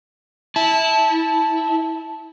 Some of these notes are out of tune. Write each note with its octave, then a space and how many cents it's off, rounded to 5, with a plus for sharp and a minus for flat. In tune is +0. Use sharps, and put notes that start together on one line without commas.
E4 -20 A5 -5